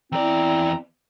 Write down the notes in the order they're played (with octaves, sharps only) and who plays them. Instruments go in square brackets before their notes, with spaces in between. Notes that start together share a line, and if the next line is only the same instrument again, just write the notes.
[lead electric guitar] E2 D5 [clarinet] C4 [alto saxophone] E4 [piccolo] A#5